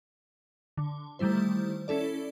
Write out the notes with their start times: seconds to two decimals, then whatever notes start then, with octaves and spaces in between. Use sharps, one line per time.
0.77 D3
1.19 D#3 G3 A3 E4 C5
1.88 C#4 E4 A4 D5